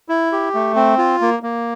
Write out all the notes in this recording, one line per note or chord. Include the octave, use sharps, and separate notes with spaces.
E4
G4
A3
C4
F4
A#3
A#3